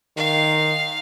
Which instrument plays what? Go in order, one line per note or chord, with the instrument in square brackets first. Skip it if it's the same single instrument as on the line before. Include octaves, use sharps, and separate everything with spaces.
[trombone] D#3 [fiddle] F5